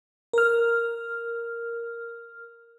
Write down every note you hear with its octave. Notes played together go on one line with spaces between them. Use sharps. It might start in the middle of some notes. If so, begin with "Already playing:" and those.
A#4 F6